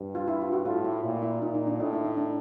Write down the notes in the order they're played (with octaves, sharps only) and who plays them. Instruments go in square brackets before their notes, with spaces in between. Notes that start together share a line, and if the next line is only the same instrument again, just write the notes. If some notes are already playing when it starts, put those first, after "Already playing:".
Already playing: [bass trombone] G2
[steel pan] F4
E4
F4
F#4
[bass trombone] A2 [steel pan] F4
[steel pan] E4
[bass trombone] A#2 [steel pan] E4
[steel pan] E4
[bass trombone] A#2 [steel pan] D#4
[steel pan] D#4
D4
[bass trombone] A2 [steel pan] D#4
[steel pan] E4
D#4
D4